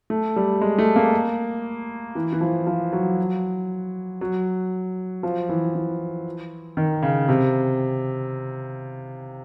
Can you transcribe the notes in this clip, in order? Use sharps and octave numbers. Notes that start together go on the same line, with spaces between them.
A3
G3
G#3
A3
A#3
E3
E3
F3
F3
F#3
F#3
F3
E3
E3
D#3
C#3
C3